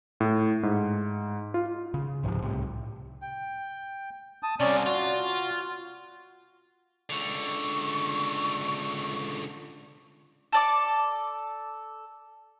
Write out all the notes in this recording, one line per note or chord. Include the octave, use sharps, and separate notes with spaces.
A2
G#2
F4
C#3
C#2 G#2 C3 F3
C2 A2 C3
G5
A5 D#6
C2 C3 C#4 D5
F4 F#4
C#2 D3 C#6
A4 D5 D6